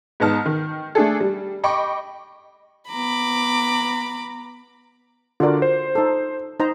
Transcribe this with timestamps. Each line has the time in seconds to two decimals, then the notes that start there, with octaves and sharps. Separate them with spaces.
0.20 G#2 B3 D#4 A5 F6
0.46 D#3
0.95 A3 D4 G#4 A4
1.20 G3
1.64 D#5 G5 B5 C#6 D6
2.91 B3 A#5 B5 D6
5.40 D3 F4 F#4 A#4 D5
5.62 C5
5.95 D#4 A4
6.60 D#4 C5 A#5